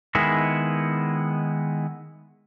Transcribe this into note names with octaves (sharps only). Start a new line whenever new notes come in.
D#3 G#3 B3 E4